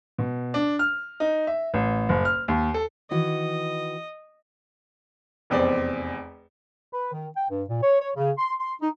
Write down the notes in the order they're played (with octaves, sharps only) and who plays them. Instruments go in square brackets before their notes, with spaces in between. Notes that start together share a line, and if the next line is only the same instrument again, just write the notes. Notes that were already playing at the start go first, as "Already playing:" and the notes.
[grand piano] B2
D4
F6
D#4
E5
A1
F#1
F6
D#2
A4
[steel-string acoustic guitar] D#3 E3 F#4 [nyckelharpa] D#5
[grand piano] F1 E2 C4 D5
[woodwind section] B4
D#3
G5
G2
A#2
C#5
C#5
C#3
C6
C6
D#4